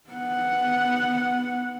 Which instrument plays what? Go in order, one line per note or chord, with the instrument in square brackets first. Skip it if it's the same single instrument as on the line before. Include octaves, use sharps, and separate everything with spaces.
[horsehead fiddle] B3 F#5